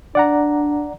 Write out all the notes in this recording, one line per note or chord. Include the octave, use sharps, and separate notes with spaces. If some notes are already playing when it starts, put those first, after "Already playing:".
D4 D5 F#5 A#5